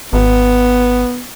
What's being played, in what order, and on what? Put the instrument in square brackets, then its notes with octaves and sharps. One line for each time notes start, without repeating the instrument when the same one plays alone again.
[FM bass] G#1 [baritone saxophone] B3